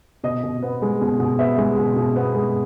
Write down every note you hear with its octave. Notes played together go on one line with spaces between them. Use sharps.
B2 D#5
B2
B3
G#3
B2
B2
B3 E5
G#3
B2
B2
B3
G#3